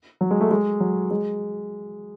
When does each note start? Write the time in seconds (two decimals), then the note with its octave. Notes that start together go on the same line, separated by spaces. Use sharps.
0.21 F#3
0.31 G#3
0.41 A3
0.51 G#3
0.80 F#3
1.11 G#3